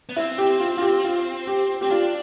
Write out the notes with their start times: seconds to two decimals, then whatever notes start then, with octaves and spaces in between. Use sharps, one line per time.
0.09 B3
0.16 C4 E4
0.38 G4
0.60 F4
0.77 F4
0.82 G4
1.04 F4
1.47 G4
1.81 C4 G4
1.90 D4 F4